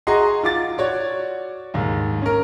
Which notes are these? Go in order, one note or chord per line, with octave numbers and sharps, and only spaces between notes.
F#4 G#4 D#5 A#5 C6
F4 D6 A6
F#4 C#5 D5
D#2 G#2
C#4 A#4